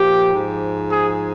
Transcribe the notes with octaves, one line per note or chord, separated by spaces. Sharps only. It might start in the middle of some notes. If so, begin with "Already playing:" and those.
Already playing: A#2 F3 G4
G#2 F3
G#4